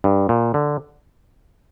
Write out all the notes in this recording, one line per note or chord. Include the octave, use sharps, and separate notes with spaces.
G2
A#2
D3